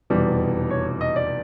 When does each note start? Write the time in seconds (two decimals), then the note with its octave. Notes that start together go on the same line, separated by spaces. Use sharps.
0.10 F1 E2 B2 G3
0.70 C#5
1.01 D#5
1.16 D5